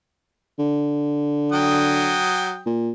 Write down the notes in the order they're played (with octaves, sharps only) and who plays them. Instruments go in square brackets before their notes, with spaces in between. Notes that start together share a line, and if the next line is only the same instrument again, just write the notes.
[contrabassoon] D3
[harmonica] F#3 G5 D#6
[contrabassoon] A#2